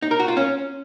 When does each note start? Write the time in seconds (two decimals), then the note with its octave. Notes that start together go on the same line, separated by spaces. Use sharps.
0.02 D#4
0.11 A#4
0.20 F#4
0.28 F4
0.37 C#4